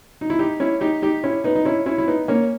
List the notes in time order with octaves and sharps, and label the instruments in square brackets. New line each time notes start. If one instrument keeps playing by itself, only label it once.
[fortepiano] D#4
E4
D#4 G4
C#4 E4
D#4 G4
D#4 G4
C#4 E4
B3 D#4
D#4
C#4 E4
C#4 E4
E4
B3 D#4
A#3 C#4